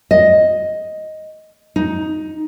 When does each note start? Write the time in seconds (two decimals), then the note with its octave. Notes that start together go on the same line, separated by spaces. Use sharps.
0.11 D#5
1.76 D#4